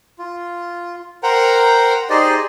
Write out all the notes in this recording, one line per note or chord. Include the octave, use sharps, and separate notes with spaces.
F4
A#4 C5 F#5 G5 A#5
D#4 G4 G#4 C5 D5 D#5